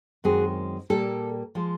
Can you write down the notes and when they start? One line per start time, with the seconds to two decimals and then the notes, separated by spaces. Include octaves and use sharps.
0.24 F#2 D#3 G#3 C4 F#4 G#4
0.90 A#2 G3 A#3 G4 A4
1.55 F3 G#3